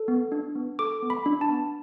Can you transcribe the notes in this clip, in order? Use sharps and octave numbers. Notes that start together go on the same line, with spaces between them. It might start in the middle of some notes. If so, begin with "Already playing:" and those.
Already playing: A4
B3
D4
B3
A4 D6
B3
B5
D4
A5
B3